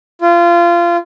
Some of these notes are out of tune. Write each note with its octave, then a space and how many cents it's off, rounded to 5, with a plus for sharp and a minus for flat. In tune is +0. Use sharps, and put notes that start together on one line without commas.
F4 -25